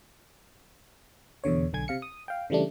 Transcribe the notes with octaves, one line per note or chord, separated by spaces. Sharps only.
E2 B2 D3 C#5
B1 D3 G#5 G#6
C3 F5 C#7
D#6
F5 G5
C#3 E3 G3 A3 D4